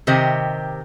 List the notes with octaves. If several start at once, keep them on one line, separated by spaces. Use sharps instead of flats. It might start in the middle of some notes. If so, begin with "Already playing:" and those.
C3 D#3 G4 C5 D#5